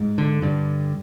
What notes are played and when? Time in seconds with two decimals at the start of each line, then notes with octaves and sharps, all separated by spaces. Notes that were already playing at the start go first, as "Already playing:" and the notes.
Already playing: G#2
0.18 D3
0.42 G2 D3